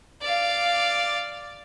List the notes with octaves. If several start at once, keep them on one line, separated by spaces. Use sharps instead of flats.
D5 F5